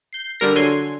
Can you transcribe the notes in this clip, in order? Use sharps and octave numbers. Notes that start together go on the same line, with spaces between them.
G6 C7
D3 G3 A#4 A#6
D3 F#3 G#5 C6